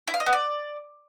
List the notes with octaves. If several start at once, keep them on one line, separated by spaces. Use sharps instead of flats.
E4
F5
D#5
B3
D5